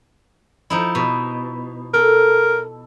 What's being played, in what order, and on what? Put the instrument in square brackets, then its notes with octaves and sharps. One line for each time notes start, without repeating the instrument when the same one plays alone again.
[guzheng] F3 D#4 E4
B2
[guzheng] A4 [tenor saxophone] A#4